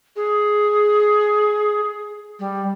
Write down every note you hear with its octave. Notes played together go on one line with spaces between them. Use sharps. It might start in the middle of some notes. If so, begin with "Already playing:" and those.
G#4
G3